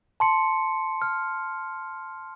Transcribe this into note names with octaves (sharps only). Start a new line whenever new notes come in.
A5 C6 C#7
F6